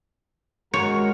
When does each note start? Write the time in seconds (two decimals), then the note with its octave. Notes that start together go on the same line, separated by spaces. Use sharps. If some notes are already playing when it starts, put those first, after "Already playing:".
0.74 G#3 F#4 A#4 C#5